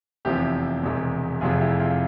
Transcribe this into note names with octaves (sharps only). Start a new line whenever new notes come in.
F1 E2 C3 F3 E4 G4
E1 E2 C3
F1 F2 C3 F4 G#4
E4 G4
F4